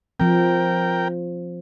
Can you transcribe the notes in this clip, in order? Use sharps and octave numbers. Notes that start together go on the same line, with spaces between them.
F3 C4 A#4 G5